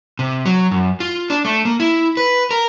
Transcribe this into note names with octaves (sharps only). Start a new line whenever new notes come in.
C3
F#3
F#2
F4
D4
A3
A#3
E4
B4
A#4